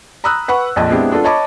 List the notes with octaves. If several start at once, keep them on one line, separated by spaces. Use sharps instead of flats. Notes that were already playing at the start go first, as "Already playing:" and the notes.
A#5 B5 D#6 E6 F#6
B4 F#5 B5 C#6
A#1 F2 D#5 A5
G#3 B3 C4 D4 E4 G4
B3 D4 F4 A4
C#5 D#5 A5 B5 C#6 D6